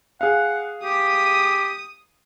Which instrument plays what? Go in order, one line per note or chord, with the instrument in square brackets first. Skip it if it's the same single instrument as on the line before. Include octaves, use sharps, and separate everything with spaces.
[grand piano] G#4 F5 [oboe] F#5
[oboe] G4 [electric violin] D#6